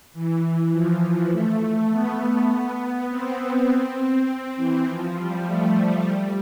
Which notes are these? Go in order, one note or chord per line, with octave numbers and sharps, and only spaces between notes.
E3
F3
A3
A3
B3
B3
C4
C4
E3
F3
G3
A3
F3
G3